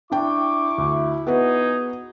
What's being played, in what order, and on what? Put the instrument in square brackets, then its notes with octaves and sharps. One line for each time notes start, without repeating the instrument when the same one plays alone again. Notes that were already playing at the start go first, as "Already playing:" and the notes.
[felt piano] D4 G5 [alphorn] E4 [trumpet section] C#6 D6
[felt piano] D2
[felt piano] B3 F#4 B4 [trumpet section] D#4 G#4